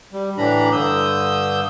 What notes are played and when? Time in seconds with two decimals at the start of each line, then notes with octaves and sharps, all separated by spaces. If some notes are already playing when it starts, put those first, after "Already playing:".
0.13 G3
0.38 A2 D3 E3 D4 A#5 B5
0.72 G2 D3 D#6 E6 G6